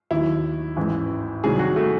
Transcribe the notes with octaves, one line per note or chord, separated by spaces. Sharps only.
D#2 D#3 F#3 E4
A1 G#2 E3
C2 C3 D#3 F#3 G#4
F#4
A3